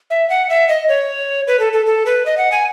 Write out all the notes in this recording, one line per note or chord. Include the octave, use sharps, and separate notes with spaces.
E5
F#5
E5
D#5
C#5
B4
A4
A4
A4
B4
D#5
F#5
G#5